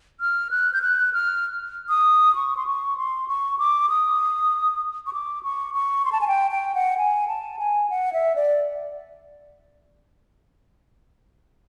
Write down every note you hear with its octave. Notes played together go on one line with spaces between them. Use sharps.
F6
F#6
G6
F#6
F6
D#6
C#6
C6
C#6
C6
C#6
D6
D#6
C#6
D6
C#6
C#6
C6
A5
G#5
G5
G5
F#5
G#5
A5
G#5
F#5
E5
D5